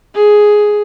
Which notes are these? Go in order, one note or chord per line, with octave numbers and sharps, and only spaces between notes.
G#4